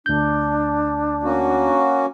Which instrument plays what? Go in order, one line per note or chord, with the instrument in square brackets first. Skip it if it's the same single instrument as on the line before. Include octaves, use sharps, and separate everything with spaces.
[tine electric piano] D2 G6 [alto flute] D4
[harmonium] A#3 C#4 F#4